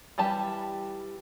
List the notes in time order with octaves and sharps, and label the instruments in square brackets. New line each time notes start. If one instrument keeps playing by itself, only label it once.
[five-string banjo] E3 G3 G4 A5